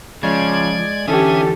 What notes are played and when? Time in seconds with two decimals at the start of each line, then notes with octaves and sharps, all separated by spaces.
0.23 C#3 F3 G#3 D5 G#6
1.08 D3 E3 C#4 G4 A4 E5 G#5 D#6